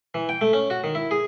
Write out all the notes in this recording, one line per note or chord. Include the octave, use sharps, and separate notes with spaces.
E3
G5
A3
C#4
F#4
D#3
E4
G#4